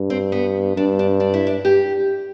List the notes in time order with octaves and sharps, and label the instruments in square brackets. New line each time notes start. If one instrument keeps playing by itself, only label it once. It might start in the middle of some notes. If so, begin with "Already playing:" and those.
Already playing: [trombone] G2
[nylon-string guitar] C4
B3
[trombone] G2 [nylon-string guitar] D4
[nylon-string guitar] D4
D4
E4
D4
G4